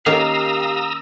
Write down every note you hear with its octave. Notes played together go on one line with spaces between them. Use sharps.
D#3 A#3 C#4 G4 F5 A#5 D#6 E6